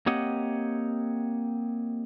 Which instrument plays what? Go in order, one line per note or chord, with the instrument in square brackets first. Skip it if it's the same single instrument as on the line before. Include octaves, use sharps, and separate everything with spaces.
[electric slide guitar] A#3 C4 G4 C#5 D#5 F#5